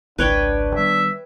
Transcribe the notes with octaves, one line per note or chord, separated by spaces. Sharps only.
G#1 C#2 D4 B4 C#5 G5
D#3 G3 B3 E5